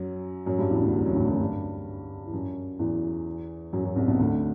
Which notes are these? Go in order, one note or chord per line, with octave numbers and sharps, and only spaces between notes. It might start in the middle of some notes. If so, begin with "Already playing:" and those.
Already playing: F#2 F#3
F#2 F#3
G2 G3
E2 E3
D2 D3
C2 C3
F#2 F#3
D2 D3
F#2 F#3
G2 G3
E3
F#2 F#3
E2 E3
F#2 F#3
F#2 F#3
C2 C3
B1 B2
D2 D3